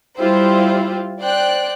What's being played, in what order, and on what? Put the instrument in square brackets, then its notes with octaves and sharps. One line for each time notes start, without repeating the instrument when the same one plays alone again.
[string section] G3 E4 F4 G4 C5
C5 D5 G5 F#6